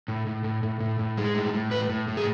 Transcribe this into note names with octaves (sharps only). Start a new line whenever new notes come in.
A2
A2
A2
A2
A2
A2
G#3
A2
A2
A2 B4
A2
A2
G#4